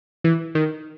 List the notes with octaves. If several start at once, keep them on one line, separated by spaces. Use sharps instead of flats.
E3
D#3